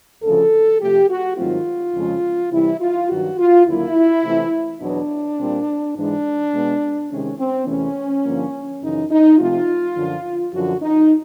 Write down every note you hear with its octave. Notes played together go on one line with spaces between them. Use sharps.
D2 C#3 F3 A4
C3 F3 A3 G4
F#4
G#2 D#3 F#3 A3 C4 F4
F2 C#3 F3 G#3
C3 E3 G3 E4
F4
G2 D#3 F#3 F#4
F4
D#2 D3 F#3 A#3 E4
C3 E3 A3 C4
E2 B2 F#3 B3 D4
A#2 G3 C4
G#2 E3 G#3 D4
B2 G#3 B3
C3 D#3 G#3 C#4
C4
E2 C3 E3 A3 C#4
G2 D3 F3 A#3
F#2 C#3 E3 D#4
D#4
C3 F3 A3 C4 F4
F#2 D3 F3
F#2 D3 F3 F#4
D#4